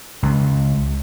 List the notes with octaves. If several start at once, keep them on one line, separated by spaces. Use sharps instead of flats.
C#2